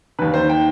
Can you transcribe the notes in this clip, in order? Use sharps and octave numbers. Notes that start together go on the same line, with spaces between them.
D#2 D#3 B4
C5
G5